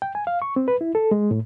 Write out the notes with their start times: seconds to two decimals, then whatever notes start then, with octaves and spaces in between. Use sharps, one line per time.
0.02 G5
0.15 G#5
0.27 F5
0.42 C#6
0.56 C4
0.68 B4
0.81 E4
0.95 A4
1.11 G#3
1.31 A2